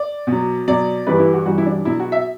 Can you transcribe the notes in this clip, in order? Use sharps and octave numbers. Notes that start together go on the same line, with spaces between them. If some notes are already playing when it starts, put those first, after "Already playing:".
Already playing: D5
B2
F#3
B2 F#3 D5
G2 E3 G3 B4
E4
F#4
G2 E3 G3 F#4
E4
D4
B2 F#3 E4
F#4
E5